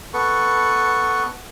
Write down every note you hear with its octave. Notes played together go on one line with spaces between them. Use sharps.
B3 A4 B4 C#6